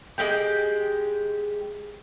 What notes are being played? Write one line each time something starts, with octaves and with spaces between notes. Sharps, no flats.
G#3 C#4 G4 G5